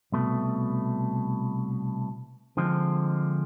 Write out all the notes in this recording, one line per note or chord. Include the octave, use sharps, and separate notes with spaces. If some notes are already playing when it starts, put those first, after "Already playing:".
C2 B2 A3
D3 F3 G#3 C4